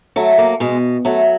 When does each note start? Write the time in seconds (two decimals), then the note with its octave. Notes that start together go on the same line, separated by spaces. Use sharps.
0.16 F#3 A3
0.38 A#3
0.60 B2 G#3
1.05 F#3 A3